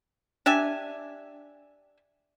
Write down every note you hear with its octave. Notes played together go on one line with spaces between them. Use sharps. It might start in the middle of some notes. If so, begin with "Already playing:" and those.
D4 G4 E5 G#5